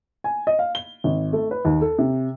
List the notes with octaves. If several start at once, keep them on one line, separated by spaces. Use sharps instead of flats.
G#5
D#5
F5
G7
G#1
A3
B4
D#2
A4
C3